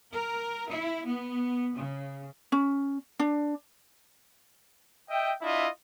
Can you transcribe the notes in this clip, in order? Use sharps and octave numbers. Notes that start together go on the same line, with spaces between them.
A#4
E4
B3
C#3
C#4
D4
D#5 E5 G5
D4 E4 F4 D#5 E5